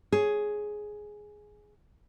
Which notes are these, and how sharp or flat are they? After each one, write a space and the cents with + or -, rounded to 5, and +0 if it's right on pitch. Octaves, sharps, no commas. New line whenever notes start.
G#4 +5 C#5 +0